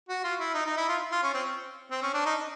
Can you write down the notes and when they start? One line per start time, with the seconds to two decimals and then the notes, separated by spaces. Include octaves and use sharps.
0.09 F#4
0.24 F4
0.39 E4
0.54 D#4
0.66 D#4
0.77 E4
0.88 F4
1.12 F4
1.23 C#4
1.34 C4
1.91 C4
2.02 C#4
2.14 D4
2.26 D#4